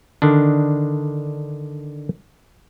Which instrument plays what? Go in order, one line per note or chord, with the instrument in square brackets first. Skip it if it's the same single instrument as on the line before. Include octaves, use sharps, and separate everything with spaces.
[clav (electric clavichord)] D3 D#3 D4